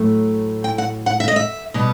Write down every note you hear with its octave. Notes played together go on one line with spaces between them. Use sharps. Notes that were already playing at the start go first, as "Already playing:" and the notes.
Already playing: A2 F#3 A3
G5
F#5
F#5
E5
D#5
E5
B2 G3 B3